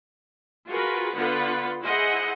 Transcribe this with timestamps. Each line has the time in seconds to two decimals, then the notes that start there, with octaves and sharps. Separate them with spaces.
0.68 F4 F#4 G#4 A#4 B4
1.14 D3 B3 F4 B4 F#5
1.83 E4 G#4 C5 D#5 F#5